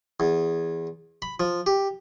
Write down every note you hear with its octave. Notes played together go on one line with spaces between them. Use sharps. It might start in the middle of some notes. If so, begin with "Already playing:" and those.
E2
B5
F3
G4